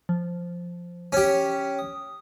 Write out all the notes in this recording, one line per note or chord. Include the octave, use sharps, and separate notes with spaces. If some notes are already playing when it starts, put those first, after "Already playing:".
F3
C#4 G4
D#6